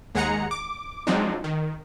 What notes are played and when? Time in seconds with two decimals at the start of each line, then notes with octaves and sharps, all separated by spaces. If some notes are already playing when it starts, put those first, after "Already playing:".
0.15 D#2 G#3 G#4 F#5 A#5 C#7
0.51 D6
1.07 F3 F#3 G#3 C4 D4 D#4
1.44 D#3